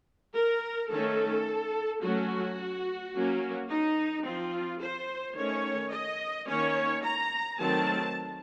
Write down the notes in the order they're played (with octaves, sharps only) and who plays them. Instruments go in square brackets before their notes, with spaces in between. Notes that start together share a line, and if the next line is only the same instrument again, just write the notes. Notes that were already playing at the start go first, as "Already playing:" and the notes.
[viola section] A#4
D#3 A3 C#4 A4
F#3 A3 C#4 F#4
F#3 A#3 C#4
D#4
F3 C4 F4
C5
D#3 A3 C#4 C#5
D#5
D#3 A#3 C#4 C#5
A#5
D#3 F#3 A3 C4 A5